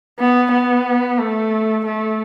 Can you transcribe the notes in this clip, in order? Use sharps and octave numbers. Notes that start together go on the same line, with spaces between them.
B3
B3
A3
A3